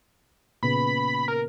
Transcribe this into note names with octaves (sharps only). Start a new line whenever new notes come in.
A#2 C#3 B3 B5
A#4